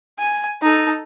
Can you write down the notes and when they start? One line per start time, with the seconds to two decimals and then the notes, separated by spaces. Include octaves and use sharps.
0.19 G#5
0.62 D#4 A4